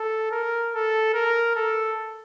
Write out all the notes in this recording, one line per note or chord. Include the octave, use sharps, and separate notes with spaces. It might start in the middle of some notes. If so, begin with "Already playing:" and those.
Already playing: A4
A#4
A4
A#4
A4